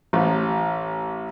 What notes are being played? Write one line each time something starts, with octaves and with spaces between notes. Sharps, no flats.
A1